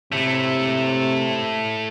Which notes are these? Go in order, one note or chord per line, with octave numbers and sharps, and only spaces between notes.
C3 A3 E4